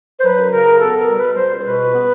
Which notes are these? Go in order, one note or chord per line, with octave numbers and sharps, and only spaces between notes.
C5
F#3 B4
F#2
C#3 A#4
F#2
B3 A4
B2
A#4
G3
B2 B4
G3 C5
C#2
C5
B2 B4
C#2
B3